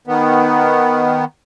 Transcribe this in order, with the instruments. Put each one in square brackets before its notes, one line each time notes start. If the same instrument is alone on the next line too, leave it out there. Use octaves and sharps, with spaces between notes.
[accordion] D#3 B3